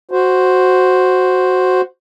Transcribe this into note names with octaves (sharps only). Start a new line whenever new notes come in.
F#4 C5